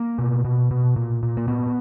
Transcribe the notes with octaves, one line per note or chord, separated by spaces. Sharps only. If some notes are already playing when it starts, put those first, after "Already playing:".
Already playing: A#3
B2
B2
B2
A#2
A#2
A#3
A#2 B3